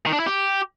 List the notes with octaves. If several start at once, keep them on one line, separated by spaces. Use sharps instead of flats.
D#3
D4
E4
G4